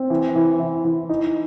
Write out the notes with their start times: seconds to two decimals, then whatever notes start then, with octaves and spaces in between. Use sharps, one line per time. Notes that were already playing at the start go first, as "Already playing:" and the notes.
Already playing: C4
0.10 E3
0.35 E3
0.60 E3
0.84 E3
1.09 D#4